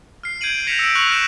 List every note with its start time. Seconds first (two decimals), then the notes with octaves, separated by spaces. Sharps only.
0.23 F6 C7
0.41 G6 G#6 C7 D7 D#7 F#7
0.67 G6 A#6 B6 C#7 E7 F7
0.79 E6 D7
0.95 C#6 F#6 F7 F#7
1.09 F6 G6 A#6 B6 E7